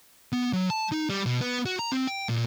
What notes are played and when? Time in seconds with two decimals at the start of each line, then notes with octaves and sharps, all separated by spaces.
0.33 B3
0.53 F#3
0.70 A5
0.92 D#4
1.10 G3
1.26 B2
1.41 B3
1.66 F#4
1.79 A#5
1.92 C4
2.07 G5
2.29 A#2